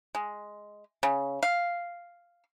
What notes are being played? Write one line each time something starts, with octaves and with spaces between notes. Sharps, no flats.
G#3
C#3
F5